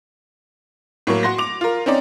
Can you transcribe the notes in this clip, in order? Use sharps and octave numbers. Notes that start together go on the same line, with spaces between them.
A2 F#3 A#3
F#4 C6 A#6
D6 F7
F4 A#4
C4 C#4 D#4 D5